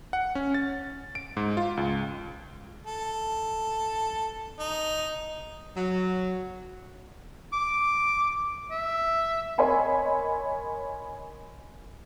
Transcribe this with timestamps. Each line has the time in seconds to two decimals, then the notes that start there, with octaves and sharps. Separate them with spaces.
0.13 F#5
0.35 C#4
0.54 A6
1.15 D7
1.37 G#2
1.57 F4
1.77 C#2
2.87 A4
4.59 D#4
5.76 F#3
7.53 D6
8.71 E5
9.58 A#4 C#5 D#5 G#5 B5 C6